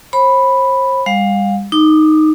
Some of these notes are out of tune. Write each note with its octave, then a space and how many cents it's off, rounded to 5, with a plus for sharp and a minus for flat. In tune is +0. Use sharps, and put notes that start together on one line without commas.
C5 +40 B5 +0
G3 +35 F5 +30
D#4 +0 D6 +20